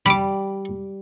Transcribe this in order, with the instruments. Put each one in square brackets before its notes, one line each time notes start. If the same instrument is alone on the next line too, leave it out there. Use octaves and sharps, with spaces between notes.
[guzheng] G3 [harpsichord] B5 D6